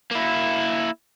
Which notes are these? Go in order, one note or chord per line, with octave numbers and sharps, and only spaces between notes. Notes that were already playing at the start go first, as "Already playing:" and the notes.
A#3 E4